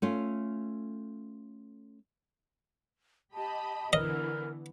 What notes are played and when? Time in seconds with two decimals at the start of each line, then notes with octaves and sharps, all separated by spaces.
0.02 A3 C#4 F4
3.34 G4 D#5 A5 B5
3.93 D3 E3 B3 A#4 D#5